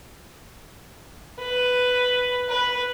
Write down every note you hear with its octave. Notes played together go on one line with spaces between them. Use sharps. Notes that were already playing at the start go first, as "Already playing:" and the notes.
B4
B4